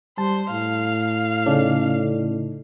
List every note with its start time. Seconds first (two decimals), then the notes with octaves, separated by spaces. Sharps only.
0.18 G3 C5 A5
0.51 A2 F5
1.46 C#3 C#4 D#4 A4 D5